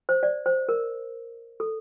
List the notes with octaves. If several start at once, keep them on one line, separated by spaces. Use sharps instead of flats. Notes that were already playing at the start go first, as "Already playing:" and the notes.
C5
D5
C5
A#4
A4